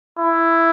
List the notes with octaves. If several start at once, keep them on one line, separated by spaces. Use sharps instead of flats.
E4